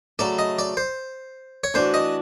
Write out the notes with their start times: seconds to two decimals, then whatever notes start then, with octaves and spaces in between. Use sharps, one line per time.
0.19 C#3 F#3 A3 D5
0.39 D#5
0.59 D5
0.77 C5
1.64 C#5
1.74 E3 A3 D4 F#4 C5
1.94 D#5